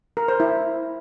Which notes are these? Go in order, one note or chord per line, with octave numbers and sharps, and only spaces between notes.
A#4
C5
E4